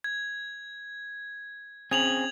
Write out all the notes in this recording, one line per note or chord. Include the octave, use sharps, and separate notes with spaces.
G#6
C4 C#4 G#4 G#6 F7 F#7